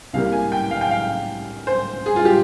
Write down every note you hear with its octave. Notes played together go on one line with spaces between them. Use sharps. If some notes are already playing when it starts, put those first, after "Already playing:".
C2 C3 G3 A#3 F5
G#5
G5
F5
G5
F5
C5
G#4
F4
G4